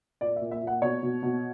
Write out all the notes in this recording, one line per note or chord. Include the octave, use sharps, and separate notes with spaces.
A#2 D5
E5
A#2
E5
A#2
F#5
B2 C#5
B2
B2